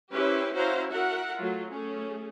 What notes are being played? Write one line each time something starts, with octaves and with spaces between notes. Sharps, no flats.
C#4 E4 G4 B4 C5
C#4 E4 F#4 C5 F5 A#5
F#4 A#4 E5 F#5
F#3 A3 F4
A3 C#4 G#4